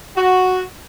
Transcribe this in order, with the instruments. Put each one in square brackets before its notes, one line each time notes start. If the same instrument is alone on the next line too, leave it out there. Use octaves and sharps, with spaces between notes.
[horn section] F#4